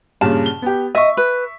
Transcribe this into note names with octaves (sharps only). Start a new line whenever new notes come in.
G2 A#2 C#3 A5
G7
B3 G4
D#5 E5 C#6
B4